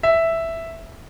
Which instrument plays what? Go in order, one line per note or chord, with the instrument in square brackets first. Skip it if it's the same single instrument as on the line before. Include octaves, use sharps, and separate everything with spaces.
[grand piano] E5